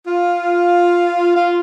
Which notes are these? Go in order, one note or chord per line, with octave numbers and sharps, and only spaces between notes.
F4
F4